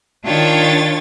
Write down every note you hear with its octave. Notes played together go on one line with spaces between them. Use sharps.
D#3 D4 F4 C#5 G5 A6